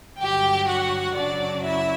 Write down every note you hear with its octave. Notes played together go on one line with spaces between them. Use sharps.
G2 D3 F#3 G4 G5
F#4 F#5
F#2 C#3 F#3 D4 D5
E4 E5